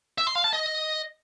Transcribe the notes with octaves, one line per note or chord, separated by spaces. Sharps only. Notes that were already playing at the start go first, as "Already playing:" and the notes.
E5
C6
F5
A5
D#5